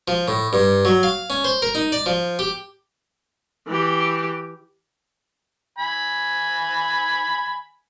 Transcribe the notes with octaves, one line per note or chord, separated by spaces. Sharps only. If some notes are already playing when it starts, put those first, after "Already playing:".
F3
A2
G2
F#3
F5
C#4
C5
A#4
D#4
D5
F3
G4
E3 G4
G#5 B5